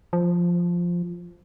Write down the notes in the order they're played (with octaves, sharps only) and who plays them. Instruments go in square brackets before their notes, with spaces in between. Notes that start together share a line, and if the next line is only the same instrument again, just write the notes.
[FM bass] F3